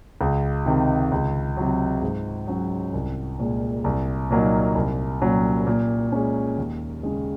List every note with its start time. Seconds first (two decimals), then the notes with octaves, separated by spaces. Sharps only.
0.21 C#2
0.66 C3 D#3
1.12 C#2
1.57 C3 F#3
2.02 G#2
2.48 F#3 C#4
2.93 C2
3.39 A#2 G#3
3.84 C2
4.30 A#2 F#3 A#3 D#4
4.75 C2
5.21 A#2 F#3 C#4
5.66 A#2
6.12 G#3 C#4
6.58 D#2
7.03 C#3 G#3